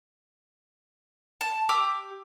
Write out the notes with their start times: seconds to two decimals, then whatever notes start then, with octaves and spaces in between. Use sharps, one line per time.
1.41 A5
1.69 G4 D6 E6